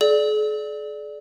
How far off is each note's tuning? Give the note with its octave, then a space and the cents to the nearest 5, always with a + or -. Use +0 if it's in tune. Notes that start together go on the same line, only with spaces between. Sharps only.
G#4 +45 D5 +0